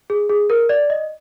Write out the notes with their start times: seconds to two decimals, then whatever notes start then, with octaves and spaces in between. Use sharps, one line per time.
0.10 G#4
0.30 G#4
0.50 A#4
0.69 D5
0.90 D#5